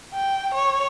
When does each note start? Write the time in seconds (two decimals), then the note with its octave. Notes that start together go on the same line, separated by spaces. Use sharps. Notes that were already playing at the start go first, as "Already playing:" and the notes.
0.14 G5
0.55 C#5